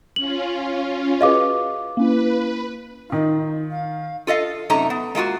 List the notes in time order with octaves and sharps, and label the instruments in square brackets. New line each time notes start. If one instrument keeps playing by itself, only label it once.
[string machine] C#4 F4 [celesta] F#7
[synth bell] F#4 G#4 B4 [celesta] D#5 F5 D6
[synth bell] A#3 C#4 E4 [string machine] B4
[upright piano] D#3 F4 [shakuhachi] D#4
[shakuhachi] F5
[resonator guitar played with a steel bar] F4 A4 D#5 F5
F#2 C3 A3 D#4 A#5
B3
G#3 A#3 F4 F#4